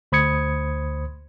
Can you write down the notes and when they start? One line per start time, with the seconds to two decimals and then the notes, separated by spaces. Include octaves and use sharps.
0.12 D2 C5 B5 D#6 G#6 C#7